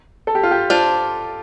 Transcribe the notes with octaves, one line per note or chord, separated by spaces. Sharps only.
A4
G4
F4
G4
D4 F4 C5